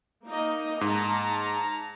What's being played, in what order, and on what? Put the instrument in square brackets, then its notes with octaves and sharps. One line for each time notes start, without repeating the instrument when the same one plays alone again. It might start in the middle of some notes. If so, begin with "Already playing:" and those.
[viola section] A#3 D#4 D#5
[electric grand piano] G#2 [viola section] A5 A#5